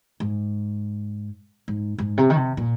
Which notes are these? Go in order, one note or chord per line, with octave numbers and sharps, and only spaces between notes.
G#2
G#2
G#2
C3
D#3
C3
A#2